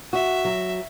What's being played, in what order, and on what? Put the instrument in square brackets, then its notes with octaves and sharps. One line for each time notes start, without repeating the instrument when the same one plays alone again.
[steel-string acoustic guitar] F#4 [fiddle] E5
[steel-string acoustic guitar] F#3